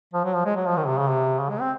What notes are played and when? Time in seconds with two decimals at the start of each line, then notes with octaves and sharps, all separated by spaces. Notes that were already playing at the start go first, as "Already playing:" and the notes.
0.13 F3
0.25 F#3
0.35 F3
0.46 G#3
0.56 F#3
0.66 F3
0.77 D#3
0.87 C3
0.98 C#3
1.09 C3
1.39 C#3
1.50 G#3
1.60 C4